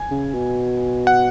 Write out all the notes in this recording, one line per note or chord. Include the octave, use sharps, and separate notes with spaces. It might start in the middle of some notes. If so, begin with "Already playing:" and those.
Already playing: G#5
C#3
B2
F#5